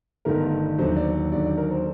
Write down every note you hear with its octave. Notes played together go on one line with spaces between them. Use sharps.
G1 G2 D#3 A3 A#4
D#2 D3 F#3 C5
D5
D#2 D3 F#3 D5
D5
A#4
C5